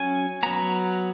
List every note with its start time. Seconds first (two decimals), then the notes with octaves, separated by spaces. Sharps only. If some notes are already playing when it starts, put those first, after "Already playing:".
Already playing: F#3 C#4 G#5
0.43 F#3 B3 A#5